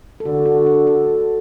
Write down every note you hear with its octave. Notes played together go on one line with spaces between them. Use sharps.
A4
D3 F#4
F#4
A4
A4